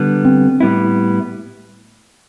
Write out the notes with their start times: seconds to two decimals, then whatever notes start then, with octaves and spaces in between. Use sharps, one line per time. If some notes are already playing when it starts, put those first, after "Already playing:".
Already playing: D3 G3 B3
0.25 C4
0.60 A2 G3 B3 E4